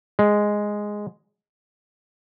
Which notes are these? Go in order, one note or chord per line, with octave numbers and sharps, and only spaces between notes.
G#3